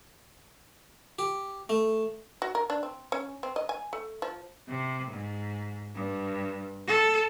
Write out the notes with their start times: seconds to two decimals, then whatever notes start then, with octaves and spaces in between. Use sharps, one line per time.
1.19 G4
1.69 A3
2.42 F#4
2.55 A#4
2.70 D4
2.83 C4
3.12 C#4
3.43 C4
3.56 D#5
3.69 G#5
3.93 A3
4.22 F3
4.68 C3
5.10 G#2
5.94 G2
6.88 A4